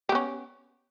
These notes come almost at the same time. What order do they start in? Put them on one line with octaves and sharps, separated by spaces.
G4 B3 C#4